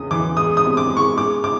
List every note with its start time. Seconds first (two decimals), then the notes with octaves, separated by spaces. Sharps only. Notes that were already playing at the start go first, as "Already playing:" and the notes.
Already playing: E2 C#3 D#6
0.11 E3 D6
0.37 G#3 D#6
0.57 D#6
0.64 C3
0.77 D6
0.91 G#3
0.97 C#6
1.17 G#3 D6
1.44 D6